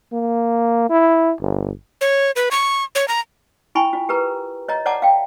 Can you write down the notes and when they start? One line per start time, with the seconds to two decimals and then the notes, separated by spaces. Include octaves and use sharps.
0.13 A#3
0.90 E4
1.41 G1
2.01 C#5
2.36 B4
2.51 C#6
2.95 C#5
3.08 A#5
3.75 E4 G5 G#5 B5 C#6
3.93 F4
4.09 G4 A#4 B4 A#5
4.68 C#5 D#5 A#5
4.86 C#5 D5 F#5 A5 A#5 D6
5.02 F5 G5